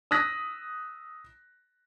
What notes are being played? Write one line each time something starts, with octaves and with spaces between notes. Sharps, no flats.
D#6 E6 F#6 A#6 B6